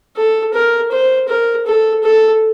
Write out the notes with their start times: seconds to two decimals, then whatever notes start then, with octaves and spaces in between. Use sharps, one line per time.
0.16 A4
0.54 A#4
0.91 C5
1.29 A#4
1.66 A4
2.04 A4